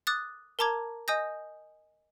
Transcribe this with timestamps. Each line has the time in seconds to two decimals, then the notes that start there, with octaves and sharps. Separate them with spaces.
0.07 D6 D#6 F#6 A6
0.59 A#4 A5 A#5 D6 G#6
1.08 D#5 G#5 D#6 G6 A#6